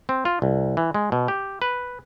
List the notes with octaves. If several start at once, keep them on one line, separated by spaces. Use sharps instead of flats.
C4
F4
C2
E3
G#3
B2
G4
B4